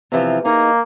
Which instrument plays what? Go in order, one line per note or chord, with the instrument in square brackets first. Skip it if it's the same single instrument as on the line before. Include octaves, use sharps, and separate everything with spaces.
[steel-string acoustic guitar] C3 E3 F3
[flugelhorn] A#3 [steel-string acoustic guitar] D#4 G#4